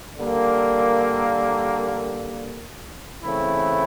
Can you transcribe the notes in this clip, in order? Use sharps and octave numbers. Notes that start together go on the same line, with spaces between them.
D3 G3 A#3
C#3 E3 A3 C4 E4